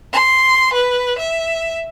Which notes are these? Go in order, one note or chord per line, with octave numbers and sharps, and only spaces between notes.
C6
B4
E5